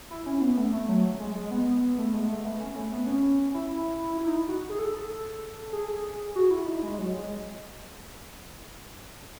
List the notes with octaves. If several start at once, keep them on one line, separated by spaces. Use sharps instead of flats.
E4
C#4
B3
A3
A3
F#3
G#3
G#3
B3
A3
G#3
A3
B3
C#4
A3
B3
C#4
E4
E4
D#4
F#4
G#4
A4
A4
G#4
G#4
F#4
E4
D#4
G#3
F#3
G#3